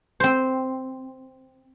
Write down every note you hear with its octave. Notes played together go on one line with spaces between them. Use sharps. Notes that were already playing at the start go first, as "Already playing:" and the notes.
C4 C5